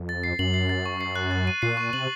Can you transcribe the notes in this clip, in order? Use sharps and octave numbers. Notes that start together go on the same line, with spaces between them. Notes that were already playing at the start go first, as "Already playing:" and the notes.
Already playing: F2
A6
C7
F#2 F#7
C7
A6
C#6
C7
F#6
A6
D#7
A#2 C7
C#6
C3 F#7